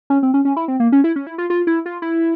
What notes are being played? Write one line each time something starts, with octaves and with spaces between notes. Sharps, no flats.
C#4
C4
C#4
C#4
E4
C4
A#3
C#4
E4
C#4
E4
F4
F4
E4
F4
E4